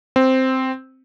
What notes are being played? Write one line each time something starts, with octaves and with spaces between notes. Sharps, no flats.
C4